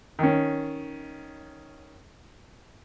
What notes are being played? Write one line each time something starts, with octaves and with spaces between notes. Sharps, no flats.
D#3 C#4